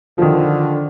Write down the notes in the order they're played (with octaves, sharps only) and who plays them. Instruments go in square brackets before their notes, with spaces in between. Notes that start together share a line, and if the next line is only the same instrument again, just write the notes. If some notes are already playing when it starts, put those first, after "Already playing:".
[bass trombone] D3 [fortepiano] D#3 F3